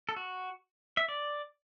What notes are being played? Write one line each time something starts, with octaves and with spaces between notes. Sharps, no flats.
A4
F#4
E5
D5